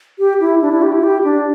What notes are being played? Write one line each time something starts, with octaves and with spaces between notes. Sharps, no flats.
G4
E4
D4
E4
G4
E4
G4
D4